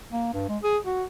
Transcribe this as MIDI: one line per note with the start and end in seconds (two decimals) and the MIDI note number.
0.12 0.29 58
0.34 0.45 43
0.49 0.58 56
0.63 0.78 68
0.85 1.04 66